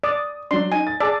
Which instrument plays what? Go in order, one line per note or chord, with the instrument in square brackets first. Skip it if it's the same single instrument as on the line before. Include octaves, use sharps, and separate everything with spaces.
[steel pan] D5 [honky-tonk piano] D#6
[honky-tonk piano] F#3 D4 [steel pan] C6
[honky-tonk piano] D#4 [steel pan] G#5
[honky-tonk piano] A6
[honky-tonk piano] G#4 A5 E6 [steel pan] D5